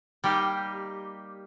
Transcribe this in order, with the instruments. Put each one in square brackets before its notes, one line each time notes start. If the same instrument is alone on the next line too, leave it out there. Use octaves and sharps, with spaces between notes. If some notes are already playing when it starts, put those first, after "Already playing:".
[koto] G3 A#3 D#4 G4